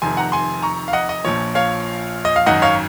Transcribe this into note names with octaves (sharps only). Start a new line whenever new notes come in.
F1 F2 C3 D#3 G#5 C6
F#5 A#5
G#5 C6
A#5 C#6
F5
D#5 F#5
D#5
A#1 A#2 F3 C#5
C#5 F5
D#5
F5
G#1 F#2 D#3 D#5 F#5
C#5 F5